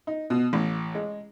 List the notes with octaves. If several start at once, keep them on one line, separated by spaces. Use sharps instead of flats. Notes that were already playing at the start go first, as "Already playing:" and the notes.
D#4
B2
A1
G#3